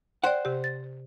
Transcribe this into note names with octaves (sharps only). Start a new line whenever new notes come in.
C5 D5 F#5 G5 C6
C3 G4
A6